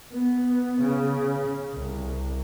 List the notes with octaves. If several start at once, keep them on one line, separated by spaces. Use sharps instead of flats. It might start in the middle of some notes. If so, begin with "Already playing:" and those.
B3
C#3
C2